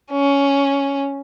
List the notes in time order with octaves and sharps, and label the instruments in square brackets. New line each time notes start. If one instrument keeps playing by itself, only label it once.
[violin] C#4